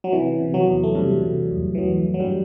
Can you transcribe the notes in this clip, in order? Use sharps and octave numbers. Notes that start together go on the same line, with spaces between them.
F#3
C3 E3
C3
F#3
E2
A3
G2 C3 G3
C3
E2
E3
E2 F#3
E3
F#3
G2 G3